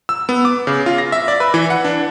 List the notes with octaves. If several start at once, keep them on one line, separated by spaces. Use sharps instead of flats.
E6
B3
D6
C#3
F4
A#6
E5
D5
B4
E3
F#5
D4